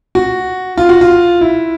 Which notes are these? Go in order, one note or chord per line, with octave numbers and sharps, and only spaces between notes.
F#4
F4
F#4
F4
E4